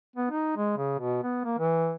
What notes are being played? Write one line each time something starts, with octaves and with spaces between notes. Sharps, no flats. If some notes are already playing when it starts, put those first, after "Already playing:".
B3
D#4
G#3
C#3
B2
B3
A#3
E3